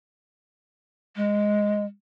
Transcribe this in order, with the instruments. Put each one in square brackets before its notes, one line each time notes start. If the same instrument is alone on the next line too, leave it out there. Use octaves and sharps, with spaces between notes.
[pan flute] G#3